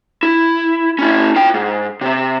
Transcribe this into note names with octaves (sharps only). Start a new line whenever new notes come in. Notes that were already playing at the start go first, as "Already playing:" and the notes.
E4
C#4 E4
F4 G5
G#2
C3 C4